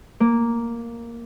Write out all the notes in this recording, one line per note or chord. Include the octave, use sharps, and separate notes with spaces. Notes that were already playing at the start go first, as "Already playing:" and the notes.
A#3